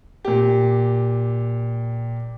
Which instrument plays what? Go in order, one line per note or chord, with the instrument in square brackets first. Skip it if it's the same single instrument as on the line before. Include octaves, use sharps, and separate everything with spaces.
[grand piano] A#2 G4